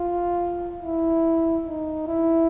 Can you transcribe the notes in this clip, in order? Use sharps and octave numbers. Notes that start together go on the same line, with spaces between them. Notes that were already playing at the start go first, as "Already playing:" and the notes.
Already playing: F4
E4
D#4
E4